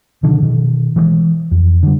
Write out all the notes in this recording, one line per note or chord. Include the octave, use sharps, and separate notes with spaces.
B2 D3 D#3 F3
B2 D#3
E3 F#3 G#3
F2
D3 G3